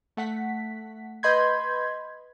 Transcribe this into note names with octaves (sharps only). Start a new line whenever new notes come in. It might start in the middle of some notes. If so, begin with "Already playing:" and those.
A3 F#5 B6
B4 D#5 B5 C6 G6 G#6